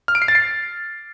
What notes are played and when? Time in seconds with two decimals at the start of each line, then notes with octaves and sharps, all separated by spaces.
0.08 F6
0.15 D7
0.22 C7
0.28 A6
0.35 C7